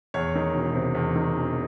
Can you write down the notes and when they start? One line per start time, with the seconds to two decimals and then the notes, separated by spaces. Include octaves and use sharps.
0.14 E2 C#5
0.35 D#3
0.54 E1
0.75 C3
0.95 E2
1.16 D#3
1.36 E1